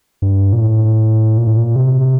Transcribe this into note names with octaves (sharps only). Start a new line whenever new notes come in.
G2
A#2
A2
A#2
A2
A#2
C3